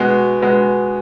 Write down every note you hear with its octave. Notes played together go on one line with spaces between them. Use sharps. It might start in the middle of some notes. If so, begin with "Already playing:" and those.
Already playing: B2 G#3 B3
B2 G#3 B3